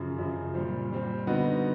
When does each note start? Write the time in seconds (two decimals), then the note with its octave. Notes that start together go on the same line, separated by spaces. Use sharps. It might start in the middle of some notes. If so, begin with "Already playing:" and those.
Already playing: F#2 C#3 F3
0.19 F#2 C#3 F3
0.54 A#2 G3 C4
0.90 A#2 G3 C4
1.27 D3 G3 B3 D#4 F#4